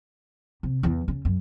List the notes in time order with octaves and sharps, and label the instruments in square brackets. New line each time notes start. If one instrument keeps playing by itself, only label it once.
[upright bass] C3
E2 E3
C#3
F#2